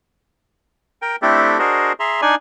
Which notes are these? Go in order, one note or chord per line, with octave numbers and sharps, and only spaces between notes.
A#4 G5
A3 C4 D4 E4 G4 A4
D4 F#4 G#4 A#4 C5 D#5
G#4 E5 A#5 C6
D4 D#4 D5 G#5